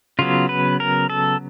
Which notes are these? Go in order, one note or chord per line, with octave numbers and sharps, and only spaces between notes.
C#3 F#3 B3 F4
B4
A#4
A4